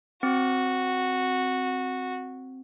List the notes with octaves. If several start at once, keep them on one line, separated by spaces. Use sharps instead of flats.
C4 F#4